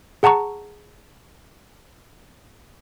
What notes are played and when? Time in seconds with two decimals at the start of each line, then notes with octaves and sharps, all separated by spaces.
0.23 G#4 F#5 A5 A#5 C#6